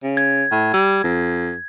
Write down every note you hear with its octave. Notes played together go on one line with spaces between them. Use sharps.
C#3
G#6
A2
G3
F2